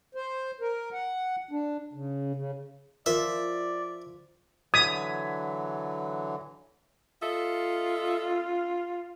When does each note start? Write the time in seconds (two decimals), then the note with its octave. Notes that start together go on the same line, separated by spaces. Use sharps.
0.15 C5
0.61 A#4
0.93 F#5
1.51 D4
1.93 C#3
2.35 C#3
3.06 F3 A#4 D5 E5
4.74 D3 E3 F#3 D#6 G#6 B6
7.22 F4 A4 D#5 E5